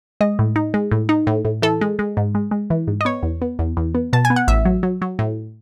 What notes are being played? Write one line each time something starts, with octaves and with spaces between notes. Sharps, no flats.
G#3 D#5
A2
D#4
G#3
A2
D#4
A2
A2
E3 A4
G#3
G#3
G#2
G#3
G#3
E3
G#2
D#5
B3 C#5
E2
B3
E2
E2
B3
B2 A5
G#5
B3
F#5
A1 E5
F#3
F#3
F#3
A2